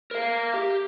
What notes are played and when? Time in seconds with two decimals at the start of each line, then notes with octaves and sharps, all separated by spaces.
0.11 A#4 F5
0.54 G4